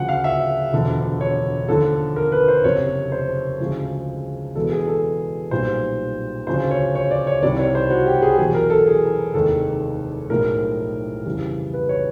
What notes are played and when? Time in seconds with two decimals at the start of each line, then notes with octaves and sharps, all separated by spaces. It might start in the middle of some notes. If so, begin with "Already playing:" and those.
Already playing: D2 C#3 F3 F#5
0.09 F5
0.24 E5
0.73 E1 D2 D3 F3
1.21 C#5
1.68 D#2 D3 F3 A4
2.16 A#4
2.32 B4
2.48 C5
2.64 F#1 F2 C3 C#5
3.12 C5
3.60 D2 C#3 F3 G#3
4.56 E2 B2 G#3 A4
4.72 G#4
4.87 A4
5.51 B1 A#2 G3 C5
6.47 D2 C#3 F3 C5
6.71 C#5
6.95 C#5
7.11 D5
7.27 C#5
7.42 C2 C3 D#3 D5
7.59 C#5
7.75 C5
7.90 F#4
8.06 G4
8.22 G#4
8.38 E2 B2 F#3 G#4
8.55 A#4
8.70 A4
8.86 G#4
9.34 F1 D#2 D#3 G#3 A4
10.30 B1 A2 F3 G#3 A#4
11.26 F2 C#3 E3 G3
11.73 B4
11.89 C#5